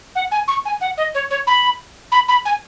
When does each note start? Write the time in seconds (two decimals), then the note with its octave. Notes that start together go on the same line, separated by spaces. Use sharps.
0.15 F#5
0.31 G#5
0.47 C#6
0.65 G#5
0.81 F#5
0.97 D#5
1.14 C#5
1.30 C#5
1.47 B5
2.11 B5
2.28 B5
2.45 G#5